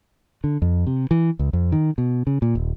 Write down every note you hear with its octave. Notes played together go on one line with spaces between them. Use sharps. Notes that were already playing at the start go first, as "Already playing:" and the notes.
D3
F2
C3
E3
C#2
F2
D#3
B2
C#3
A#2
D#1